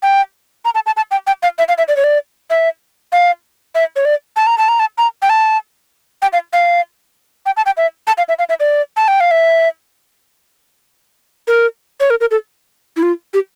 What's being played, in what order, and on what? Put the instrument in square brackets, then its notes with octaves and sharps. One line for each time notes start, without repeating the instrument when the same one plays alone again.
[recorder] G5
A#5
A5
A5
A5
G5
G5
F5
E5
F5
E5
D5
C#5
D5
E5
F5
E5
C#5
D5
A5
A#5
A5
A#5
A5
A#5
G5
A5
G5
F5
F5
G5
A5
G5
E5
A5
F5
E5
F5
E5
D5
A5
G5
F5
E5
A#4
C#5
A#4
A#4
A4
E4
F4
G4